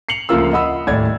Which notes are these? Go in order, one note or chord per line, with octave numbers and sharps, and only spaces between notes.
C7 C#7 F7 F#7
D2 C#3 F3 A#3 F4 E6
D#5 F#5 B5 D#6 E6
D#1 A2 D5 G#6